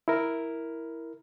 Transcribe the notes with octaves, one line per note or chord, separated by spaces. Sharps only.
E4 A#4